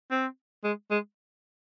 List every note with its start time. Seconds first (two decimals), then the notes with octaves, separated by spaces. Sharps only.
0.11 C4
0.64 G#3
0.91 G#3